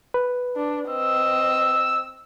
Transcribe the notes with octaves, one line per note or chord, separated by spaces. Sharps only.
B4
D4
C4 D#5 E6